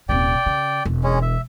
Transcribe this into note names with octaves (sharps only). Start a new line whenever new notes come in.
D#1 C3 D5 G5
C#3
E1
G#3 C#4
E5